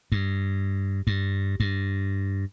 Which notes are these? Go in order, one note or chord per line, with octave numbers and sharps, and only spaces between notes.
G2
G2
G2